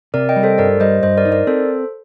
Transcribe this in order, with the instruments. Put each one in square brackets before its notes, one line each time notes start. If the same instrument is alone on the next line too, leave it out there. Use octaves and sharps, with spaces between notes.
[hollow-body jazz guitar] C3 [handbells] A#4 D5
[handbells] D#5 G5
[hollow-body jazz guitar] G3
[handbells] A4 C5
[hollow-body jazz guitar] G2 [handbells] A#4 D5
[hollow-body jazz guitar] G3 [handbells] C5 D#5
[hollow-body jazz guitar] G2 [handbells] C5 D#5
[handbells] A#4 D5
[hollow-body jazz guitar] D#4
[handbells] A#4 D5
[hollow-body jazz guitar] C4 [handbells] A4 C5